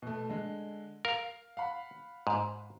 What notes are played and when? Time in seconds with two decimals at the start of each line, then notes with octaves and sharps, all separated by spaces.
0.02 B2 A3
0.29 D3 G#3
1.05 A#4 F5
1.57 F5 F#5 B5
2.27 G#2